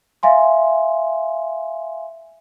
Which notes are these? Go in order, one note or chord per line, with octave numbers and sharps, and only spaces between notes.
E5 F5 G#5 C6